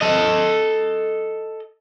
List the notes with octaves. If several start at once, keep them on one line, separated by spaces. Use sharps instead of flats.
A4 D#5